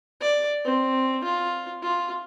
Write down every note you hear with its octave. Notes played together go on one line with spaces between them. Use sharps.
D5
C4
F4
F4